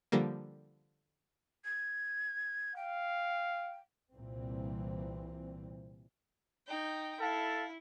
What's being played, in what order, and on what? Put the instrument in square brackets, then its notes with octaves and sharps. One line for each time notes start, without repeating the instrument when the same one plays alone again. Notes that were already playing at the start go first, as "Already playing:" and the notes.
[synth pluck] D3 F3 G3 A#3
[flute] G#6
[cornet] F5 [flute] G5
[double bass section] C2 A#2 E3 C4
[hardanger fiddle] D#4 G5
[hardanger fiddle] E4 [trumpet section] A4 F5 A5